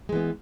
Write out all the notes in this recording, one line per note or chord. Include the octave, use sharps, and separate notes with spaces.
E3 G#3 B3